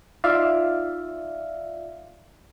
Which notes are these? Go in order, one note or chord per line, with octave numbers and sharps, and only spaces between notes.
D#4 F4 D5 E5 F5